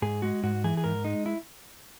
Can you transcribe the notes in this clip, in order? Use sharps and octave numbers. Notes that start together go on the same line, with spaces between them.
G#2 G#4
G#3 F#4
G#2 F#4
E3 G#4
G#4
G#2 A#4
G#3 D#4
E4